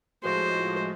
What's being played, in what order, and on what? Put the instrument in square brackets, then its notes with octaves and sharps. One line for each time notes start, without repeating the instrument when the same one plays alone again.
[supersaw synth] A2 F3 G#3 [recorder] F#4 [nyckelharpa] C5